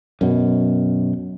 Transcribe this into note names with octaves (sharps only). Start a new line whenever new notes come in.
F#2 B2